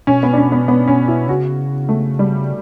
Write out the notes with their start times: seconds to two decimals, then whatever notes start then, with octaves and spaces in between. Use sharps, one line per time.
0.07 B2 C#4
0.23 B3
0.33 D4
0.37 C#4
0.52 B3
0.68 B3
0.88 C#4
1.08 E4
1.28 C#3 F#4
1.89 A3
2.19 G3